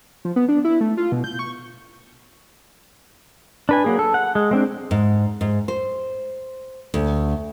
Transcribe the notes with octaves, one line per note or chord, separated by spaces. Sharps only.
F3
B3
D4
E4
A3
F4
B2
G6
C#6
D4 B4 G#5
F#3 A#3 G#4
A4
F#5
G#3
G#3 C4 D4
G#2
G#2
C5
D2